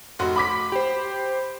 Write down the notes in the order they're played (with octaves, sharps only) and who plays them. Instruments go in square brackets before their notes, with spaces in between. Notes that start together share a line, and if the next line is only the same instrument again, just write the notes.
[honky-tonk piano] F1 F#4 C6
B5 D6 B6
[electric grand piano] G4 C5